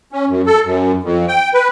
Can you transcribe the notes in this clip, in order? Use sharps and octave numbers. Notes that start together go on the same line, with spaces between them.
C#4
F#2
A4
F#2
F2
G5
B4